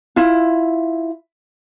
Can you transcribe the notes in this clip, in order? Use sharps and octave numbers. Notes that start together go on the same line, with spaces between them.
E4 F4